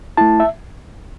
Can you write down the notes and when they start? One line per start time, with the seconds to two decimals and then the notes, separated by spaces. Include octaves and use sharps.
0.17 A3 E4 A5
0.40 E5